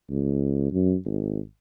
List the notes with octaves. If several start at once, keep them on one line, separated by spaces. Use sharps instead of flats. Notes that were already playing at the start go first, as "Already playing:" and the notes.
C#2
F#2
G#1